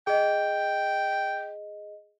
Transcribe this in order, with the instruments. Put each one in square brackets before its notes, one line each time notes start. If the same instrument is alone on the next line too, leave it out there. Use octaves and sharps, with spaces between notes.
[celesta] G#4 D#5 [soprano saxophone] G5